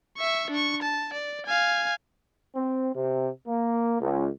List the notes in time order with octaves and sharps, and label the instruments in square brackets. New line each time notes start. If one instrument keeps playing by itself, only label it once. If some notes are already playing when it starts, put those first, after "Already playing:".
[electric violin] E5 C#6
D4 C#6
A5
D5
F5 G#5
[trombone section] C4
C3
A#3
C#2